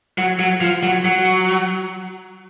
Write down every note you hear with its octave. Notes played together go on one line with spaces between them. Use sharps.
F#3
F#3
F3
F#3
F#3